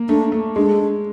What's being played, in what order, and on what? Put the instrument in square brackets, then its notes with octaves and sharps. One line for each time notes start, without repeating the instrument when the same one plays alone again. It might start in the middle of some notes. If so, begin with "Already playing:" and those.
Already playing: [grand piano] A#3
[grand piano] A3 [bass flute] D4
[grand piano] A3
[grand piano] G#3 [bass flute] D4